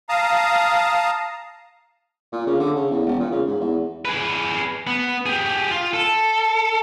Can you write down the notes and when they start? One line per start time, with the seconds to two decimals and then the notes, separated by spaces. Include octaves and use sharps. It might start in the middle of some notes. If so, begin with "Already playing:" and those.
0.09 F5 A5 A#5 D#6
2.32 A#2
2.46 C#3
2.60 D3
2.75 C#3
2.90 E2
3.06 E1
3.19 A#2
3.31 C#3
3.47 G#2
3.60 E2
4.05 G#4 B4
4.87 B3
5.26 G4 G#4
5.71 F4
5.94 A4